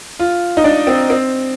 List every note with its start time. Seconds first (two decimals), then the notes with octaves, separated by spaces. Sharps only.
0.19 F4
0.57 D#4
0.64 D4
0.87 C4
1.10 C4